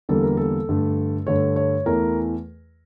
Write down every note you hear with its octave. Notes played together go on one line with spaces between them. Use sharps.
E2 D3 G3 A#3 A4
A#4
A4
G2 D3 A3
G2 D3 A3 C#5
C#5
E2 E3 A3 A#4